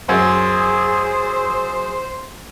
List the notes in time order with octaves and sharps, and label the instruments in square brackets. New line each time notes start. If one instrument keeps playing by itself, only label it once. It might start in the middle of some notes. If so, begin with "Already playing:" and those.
[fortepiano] F#2 [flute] G#4 [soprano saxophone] C5